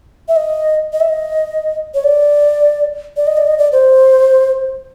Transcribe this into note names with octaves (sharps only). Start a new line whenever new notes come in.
E5
D#5
D#5
E5
D#5
C#5
D5
D5
D#5
D5
D#5
D5
C5